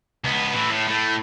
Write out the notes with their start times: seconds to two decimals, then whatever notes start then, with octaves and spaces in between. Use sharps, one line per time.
0.24 C#2 B3
0.54 A2 E3
0.71 A2
0.88 A2 A3